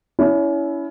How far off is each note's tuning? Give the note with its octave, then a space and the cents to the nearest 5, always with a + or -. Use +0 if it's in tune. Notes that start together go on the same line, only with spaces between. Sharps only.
C#4 +30 E4 +0